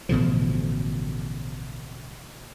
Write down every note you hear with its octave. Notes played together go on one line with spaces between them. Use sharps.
A1 B2 D3 F3